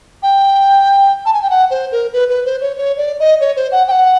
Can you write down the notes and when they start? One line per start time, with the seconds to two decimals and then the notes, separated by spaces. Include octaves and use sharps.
0.23 G5
1.26 A5
1.34 G#5
1.42 G5
1.50 F#5
1.70 C5
1.92 A#4
2.13 B4
2.29 B4
2.45 C5
2.61 C#5
2.77 C#5
2.97 D5
3.20 D#5
3.41 C#5
3.56 C5
3.72 F#5
3.88 G5
3.91 F#5